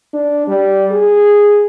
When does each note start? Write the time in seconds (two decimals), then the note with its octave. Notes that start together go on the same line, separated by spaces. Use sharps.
0.14 D4
0.48 G3
0.91 G#4